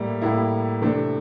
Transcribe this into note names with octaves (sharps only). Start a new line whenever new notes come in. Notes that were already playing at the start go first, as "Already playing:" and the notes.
Already playing: A2 G3 A#3 E4
A2 G3 A#3 E4
C3 E3 A3 D4